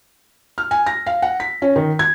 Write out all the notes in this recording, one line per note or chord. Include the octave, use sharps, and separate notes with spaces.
F6
G#5
A#6
F5
F#5
B6
C#4
D#3
G#6